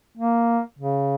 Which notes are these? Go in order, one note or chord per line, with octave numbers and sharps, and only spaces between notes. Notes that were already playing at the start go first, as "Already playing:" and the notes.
A#3
C#3